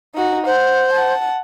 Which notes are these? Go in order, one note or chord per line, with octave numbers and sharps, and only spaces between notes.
D#4 F#4
C5 F#5
F#5 A5